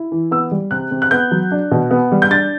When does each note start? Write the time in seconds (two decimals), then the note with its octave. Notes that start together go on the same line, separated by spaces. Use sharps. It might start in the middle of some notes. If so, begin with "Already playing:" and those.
Already playing: E4
0.12 E3
0.31 B3 E6
0.51 G3
0.71 C3 F#6
0.91 C3
1.02 F#6
1.11 B3 G6
1.31 F#3
1.51 D4
1.71 B2
1.91 B3
2.12 G3
2.22 G6
2.31 D4 A6